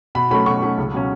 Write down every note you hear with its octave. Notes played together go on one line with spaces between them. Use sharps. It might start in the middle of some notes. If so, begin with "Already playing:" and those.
B2 B5
F#3 A3 C#4 B5
B2 C#6
F#3 A3 C#4
C#2
B2 F#3 C#4